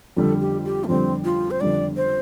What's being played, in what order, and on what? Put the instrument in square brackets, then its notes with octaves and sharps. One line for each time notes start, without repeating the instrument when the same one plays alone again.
[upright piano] F2 D3 G3 [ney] A4
[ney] G4
G4
A3
[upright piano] F2 D3 G3 [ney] C4
[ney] F4
C5
[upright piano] F2 D3 G3 [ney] D5
[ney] C5